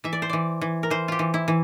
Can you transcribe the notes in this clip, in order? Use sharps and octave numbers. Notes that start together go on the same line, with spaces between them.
E3 E5
D5
C5
E3 D5
E3
A#4
E3 C5
F4 G4
E3
E4
E3